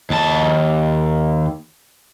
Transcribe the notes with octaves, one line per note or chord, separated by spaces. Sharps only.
D#2 A5